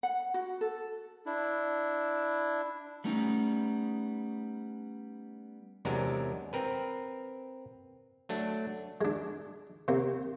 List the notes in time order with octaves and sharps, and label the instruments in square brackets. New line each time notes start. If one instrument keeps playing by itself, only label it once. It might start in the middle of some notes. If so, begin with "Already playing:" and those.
[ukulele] F#5
F#4
A4
[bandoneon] D4 E4
[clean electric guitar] G3 A3 B3 C#4 D#4
[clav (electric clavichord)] E2 C3 F#3 G#3 D4 A#4
C4 A#4 B4
F#3 A3 D4
[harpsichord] G#3 D4
C3 A#3 C4